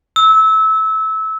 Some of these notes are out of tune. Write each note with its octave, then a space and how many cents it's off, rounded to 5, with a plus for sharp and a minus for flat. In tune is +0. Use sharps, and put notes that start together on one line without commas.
E6 -25